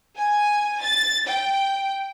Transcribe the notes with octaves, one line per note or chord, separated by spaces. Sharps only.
G#5
A6
G5